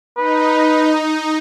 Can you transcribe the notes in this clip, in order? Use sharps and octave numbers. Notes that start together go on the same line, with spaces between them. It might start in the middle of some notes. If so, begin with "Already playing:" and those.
D#4 B4